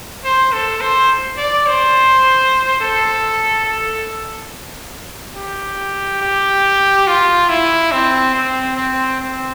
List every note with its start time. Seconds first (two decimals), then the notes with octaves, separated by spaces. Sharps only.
0.25 C5
0.53 A4
0.81 C5
1.38 D5
1.67 C5
2.81 A4
3.66 A4
5.36 G4
6.22 G4
7.07 F4
7.49 E4
7.92 C4
8.35 C4
8.77 C4
9.21 C4